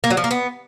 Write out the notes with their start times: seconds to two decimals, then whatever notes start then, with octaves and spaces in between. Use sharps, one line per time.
0.04 A#3
0.10 F#3
0.17 F3
0.24 A#3
0.31 B3